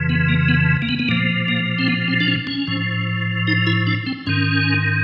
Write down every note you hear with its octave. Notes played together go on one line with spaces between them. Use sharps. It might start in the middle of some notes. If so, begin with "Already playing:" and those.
Already playing: F2 C#3 E3
B3
A#3
B3
A#3
B3
B3
A#2 F3 A#3
A#3
C4
B3
C4
D4
C#4
C#4
A2 F3
D#4
E4
D4
C4
G#2 D#3 C#4